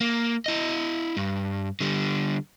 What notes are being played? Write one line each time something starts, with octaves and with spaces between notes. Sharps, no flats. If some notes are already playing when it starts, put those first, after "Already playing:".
A#3
E4 D#5
G2
D3 G3